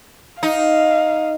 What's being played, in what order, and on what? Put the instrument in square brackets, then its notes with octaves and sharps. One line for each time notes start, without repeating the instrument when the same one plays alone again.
[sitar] D#4 [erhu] F5